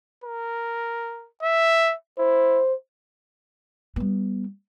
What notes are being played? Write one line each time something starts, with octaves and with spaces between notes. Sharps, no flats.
A#4
E5
E4 C5
G3 B3